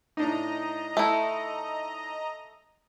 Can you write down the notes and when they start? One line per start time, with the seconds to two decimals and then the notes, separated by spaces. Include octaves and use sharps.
0.17 A2 D4 D#4 D#5 A#5
0.97 A3 E4